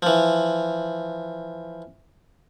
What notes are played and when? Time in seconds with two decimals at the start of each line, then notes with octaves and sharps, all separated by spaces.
0.02 E3 F3